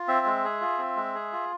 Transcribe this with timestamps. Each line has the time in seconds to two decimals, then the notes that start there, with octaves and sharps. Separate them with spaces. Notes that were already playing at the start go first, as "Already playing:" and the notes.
Already playing: F4
0.08 C4 E5
0.26 G#3
0.44 G#4
0.61 F4
0.78 C4
0.96 G#3
1.15 G#4
1.32 F4